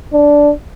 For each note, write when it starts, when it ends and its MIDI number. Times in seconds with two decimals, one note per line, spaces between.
0.13 0.51 62